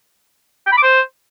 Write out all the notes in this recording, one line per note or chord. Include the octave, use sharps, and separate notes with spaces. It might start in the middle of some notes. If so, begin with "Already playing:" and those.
G5
B5
D6
C5